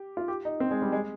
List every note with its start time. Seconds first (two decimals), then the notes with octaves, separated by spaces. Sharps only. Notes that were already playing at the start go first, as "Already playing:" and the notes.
Already playing: G4
0.17 F4
0.28 G4
0.45 D#4
0.60 C4
0.71 G#3
0.82 G3
0.92 G#3